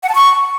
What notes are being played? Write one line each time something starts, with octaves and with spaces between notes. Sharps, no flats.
F#5
A5
C#6